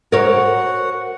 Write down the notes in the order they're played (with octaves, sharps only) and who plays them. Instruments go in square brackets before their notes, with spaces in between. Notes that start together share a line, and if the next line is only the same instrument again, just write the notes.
[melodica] F#4 F#5 [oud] A#4 C#5